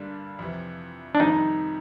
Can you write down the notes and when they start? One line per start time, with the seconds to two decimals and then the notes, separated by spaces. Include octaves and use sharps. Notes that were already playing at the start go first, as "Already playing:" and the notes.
Already playing: G2 D3 G3 A#3 D4
0.39 F2 C3 E3
1.15 D4
1.20 F2 C3 D#3 G3 D#4